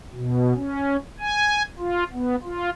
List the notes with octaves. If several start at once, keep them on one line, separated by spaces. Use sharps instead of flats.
B2
C#4
G#5
F4
B3
F4